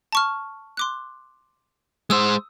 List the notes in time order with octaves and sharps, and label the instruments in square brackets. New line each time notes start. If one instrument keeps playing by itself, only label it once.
[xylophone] A5 C#6 F6
C6 D6 F#6
[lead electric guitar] G#3 C5 [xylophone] D#6 E6